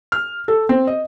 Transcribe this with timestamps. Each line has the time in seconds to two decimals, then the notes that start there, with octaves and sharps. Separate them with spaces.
0.12 F6
0.48 A4
0.69 C4
0.87 D#5